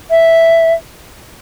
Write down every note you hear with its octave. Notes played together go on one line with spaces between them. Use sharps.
E5